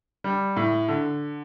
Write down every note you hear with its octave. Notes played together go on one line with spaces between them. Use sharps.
G3
A2
D3